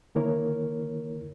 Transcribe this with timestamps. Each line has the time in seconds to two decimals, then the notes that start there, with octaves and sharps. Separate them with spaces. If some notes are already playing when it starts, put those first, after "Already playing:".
0.15 D3 D#3 A#3 E4 A#4 C#5